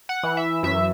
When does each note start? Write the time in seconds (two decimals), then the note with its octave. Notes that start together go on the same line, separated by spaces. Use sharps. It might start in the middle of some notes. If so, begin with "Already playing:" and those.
0.09 F#5
0.23 E3
0.37 E5
0.63 F#2 E5